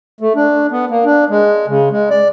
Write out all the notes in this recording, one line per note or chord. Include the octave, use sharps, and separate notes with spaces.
A3
D4
B3
A#3
D4
G#3
C#3
G#3
D5